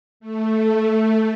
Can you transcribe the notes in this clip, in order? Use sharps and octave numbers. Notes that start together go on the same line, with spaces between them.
A3